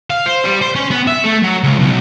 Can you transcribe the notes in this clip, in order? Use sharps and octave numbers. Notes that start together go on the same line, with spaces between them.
F5
C5
G3
C5
C#4
B3
E5
A3
F#3
C#2
B1